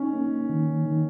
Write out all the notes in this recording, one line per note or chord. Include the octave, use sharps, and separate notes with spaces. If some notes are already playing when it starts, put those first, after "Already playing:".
Already playing: C#4 D#4
A#3
D#3
D#3